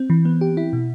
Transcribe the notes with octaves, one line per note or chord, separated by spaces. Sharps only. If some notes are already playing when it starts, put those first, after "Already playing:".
Already playing: C4
E3
B3
G4
E4
B2